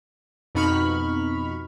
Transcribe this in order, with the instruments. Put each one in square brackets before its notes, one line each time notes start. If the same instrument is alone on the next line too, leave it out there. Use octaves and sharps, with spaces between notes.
[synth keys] F2 B2 D#4 B5 C#6 F6